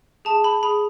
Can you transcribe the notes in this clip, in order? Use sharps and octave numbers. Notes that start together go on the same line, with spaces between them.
G#4 A5
B5
G#4 B5